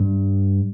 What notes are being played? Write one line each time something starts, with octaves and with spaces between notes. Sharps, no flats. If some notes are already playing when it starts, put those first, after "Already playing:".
Already playing: G2